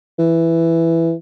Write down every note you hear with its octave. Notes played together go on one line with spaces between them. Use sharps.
E3